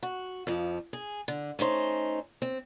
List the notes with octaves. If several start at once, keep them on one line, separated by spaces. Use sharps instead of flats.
F#4
F2 F3
G#4
D3
A3 C#4 D#4 C5
C4